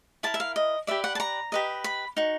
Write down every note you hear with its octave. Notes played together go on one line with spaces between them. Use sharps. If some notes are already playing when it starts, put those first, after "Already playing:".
E4 G4 A#4 A5
E5
F5
D#5
G4 B4 D5 E5
F#5
A5
A#5
G4 B4 D#5
B5
D#4 F#4